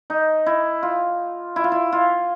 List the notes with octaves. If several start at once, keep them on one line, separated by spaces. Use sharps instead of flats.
D#4
E4
F4
E4
F4
E4
F4